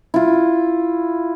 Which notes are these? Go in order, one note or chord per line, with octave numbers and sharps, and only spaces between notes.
E4 F4